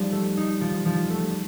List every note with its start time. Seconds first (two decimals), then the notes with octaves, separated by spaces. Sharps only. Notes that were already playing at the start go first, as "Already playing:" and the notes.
Already playing: F3 G3 D#4
0.12 A3
0.37 D#4
0.61 F3
0.86 F3
1.10 A3